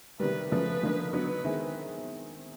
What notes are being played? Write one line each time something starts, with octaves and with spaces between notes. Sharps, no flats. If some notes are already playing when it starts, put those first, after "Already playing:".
C3 D#3 G3 B4
C#3 F3 A3 B4
D3 F3 A#3 D#4
D3 F#3 B3 D#4 B4
D#3 G#3 C4 E4